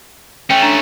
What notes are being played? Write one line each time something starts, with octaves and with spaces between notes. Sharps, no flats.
A3 C#4 G5
D4 A#5 E7